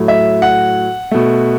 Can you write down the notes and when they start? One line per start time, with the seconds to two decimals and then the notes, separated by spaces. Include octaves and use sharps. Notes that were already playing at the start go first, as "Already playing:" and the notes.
Already playing: A2 F#3 A3
0.08 E5
0.42 F#5
1.11 B2 A3